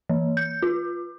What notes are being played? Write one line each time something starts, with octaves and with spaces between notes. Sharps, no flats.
E3
G6
F4